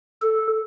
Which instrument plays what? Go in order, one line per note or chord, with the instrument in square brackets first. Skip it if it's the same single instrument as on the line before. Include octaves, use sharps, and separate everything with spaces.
[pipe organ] A4